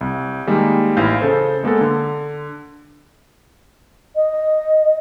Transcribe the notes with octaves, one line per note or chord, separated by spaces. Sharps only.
C2
D#3 G3 G#3 A#3
A1 E4 F5 G6
C#3 A4 C5
G#3 A#3 B3 A4
D3
D#5